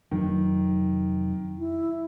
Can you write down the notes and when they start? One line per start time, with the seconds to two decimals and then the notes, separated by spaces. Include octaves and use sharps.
0.11 F1 D#3 F#3
1.58 E4